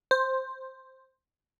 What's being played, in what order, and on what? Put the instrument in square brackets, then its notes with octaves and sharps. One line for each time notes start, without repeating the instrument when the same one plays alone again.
[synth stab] C5